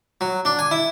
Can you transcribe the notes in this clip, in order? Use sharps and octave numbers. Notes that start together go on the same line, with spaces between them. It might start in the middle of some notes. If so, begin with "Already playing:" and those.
F#3
D4
G#5
E4